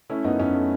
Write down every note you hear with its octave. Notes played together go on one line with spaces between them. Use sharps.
A3 C#4 E4
F#2 B3 D#4
F#2 C#4
A3